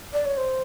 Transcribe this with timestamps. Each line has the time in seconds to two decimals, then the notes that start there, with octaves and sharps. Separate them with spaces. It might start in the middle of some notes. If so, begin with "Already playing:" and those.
0.13 D5
0.25 C#5
0.37 C5